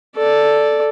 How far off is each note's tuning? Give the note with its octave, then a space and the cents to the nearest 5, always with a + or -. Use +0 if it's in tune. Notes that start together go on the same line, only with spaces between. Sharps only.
A4 +0 D5 +0